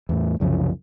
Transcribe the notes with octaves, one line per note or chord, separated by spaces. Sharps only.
E2 A2
C2 F#2 C#3 F3